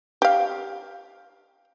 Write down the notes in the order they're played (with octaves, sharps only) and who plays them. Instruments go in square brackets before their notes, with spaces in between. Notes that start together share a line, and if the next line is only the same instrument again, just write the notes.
[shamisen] G4 F5